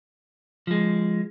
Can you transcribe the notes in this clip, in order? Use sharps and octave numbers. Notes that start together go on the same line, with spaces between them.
F3 G#3